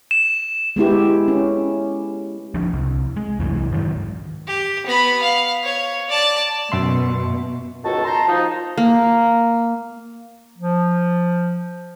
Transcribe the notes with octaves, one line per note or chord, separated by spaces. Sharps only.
E7
G#3 B3 E4 G4
C#4
D2 F3 D4
C2
G#3
C2 F#2 E3
G#2 D#3 E3 F#3
G4
B3 B5
F5
C#5
D5 A5
F#2 B2 E5 C6
C#2 B2 D#3 F#4 A4 A5
A5 A#5 C6
F3 D#4
A#3
F3